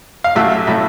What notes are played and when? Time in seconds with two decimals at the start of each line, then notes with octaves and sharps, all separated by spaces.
0.24 F5
0.35 A1 A2 F#3 A3 E5
0.67 A2 F#3 A3 E5